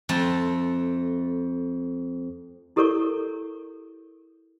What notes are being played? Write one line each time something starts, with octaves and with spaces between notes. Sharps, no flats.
F2 A3 A5
E4 G4 A4 A#4 C#5 C#6